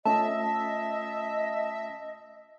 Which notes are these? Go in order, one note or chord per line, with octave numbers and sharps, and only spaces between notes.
A3 C#4 F4 D#5 E5 A5